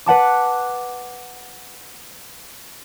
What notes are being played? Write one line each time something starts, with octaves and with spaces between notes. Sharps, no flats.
B4 F#5 A5 D6